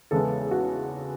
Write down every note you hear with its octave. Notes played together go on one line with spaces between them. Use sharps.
E2 C#3 E3 G#3 B3 A4
F#4